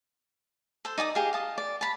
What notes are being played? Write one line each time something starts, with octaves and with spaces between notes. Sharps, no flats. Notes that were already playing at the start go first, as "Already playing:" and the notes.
A4 C5
D#4 D5 G#5 D#6
G4 G#4 F5
F5 A5 D#6
D5
A5 B5